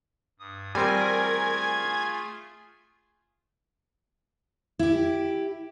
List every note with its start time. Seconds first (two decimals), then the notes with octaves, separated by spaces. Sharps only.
0.39 G2 D#6
0.75 G3 A3 C4 F4 G#4 A#4 G#5
1.64 F5
4.79 E4 G4